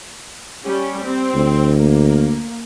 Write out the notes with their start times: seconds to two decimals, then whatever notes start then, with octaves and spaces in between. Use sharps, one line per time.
0.64 G3 C#4 G4
1.04 C4
1.35 D2
1.76 A#3